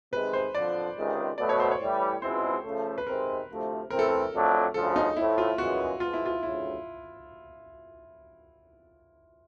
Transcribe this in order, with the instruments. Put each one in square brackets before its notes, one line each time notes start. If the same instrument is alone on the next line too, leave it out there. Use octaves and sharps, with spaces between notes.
[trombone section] C3 D#3 G#3 [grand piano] B4
[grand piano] C5
[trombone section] F2 D3 F3 [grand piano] D5
[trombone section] C#2 C3 D#3 G#3
[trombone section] B2 F#3 A3 [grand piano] D5
[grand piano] C#5
C5
C#5
[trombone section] A2 E3 G3
[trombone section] C#2 B2 G#3 C4 E4 [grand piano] C5
[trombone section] C#3 F3 A3
[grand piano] B4
[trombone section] C3 D#3 G#3 C4 [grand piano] A#4
[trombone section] D2 C3 F3 A3
[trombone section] E3 A3 C4 [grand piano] A#4
[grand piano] A4
A#4
[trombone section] F2 D3 F#3 A3 D4
[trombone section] D2 C#3 F3 [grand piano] A4
[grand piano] D#4
[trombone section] A2 F3 A3 [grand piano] E4
[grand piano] F4
[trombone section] F#2 C#3 E3 G#3 B3 [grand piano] F#4
[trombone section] F3 G#3 B3 [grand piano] F4
[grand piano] E4
F4
[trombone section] D2 C#3 F#3 [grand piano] E4